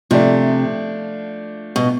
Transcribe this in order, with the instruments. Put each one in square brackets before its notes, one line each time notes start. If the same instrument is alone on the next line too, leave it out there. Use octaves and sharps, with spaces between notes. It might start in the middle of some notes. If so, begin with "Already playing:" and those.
[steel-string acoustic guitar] C3 [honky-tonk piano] F3 A3 D4
[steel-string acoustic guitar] B2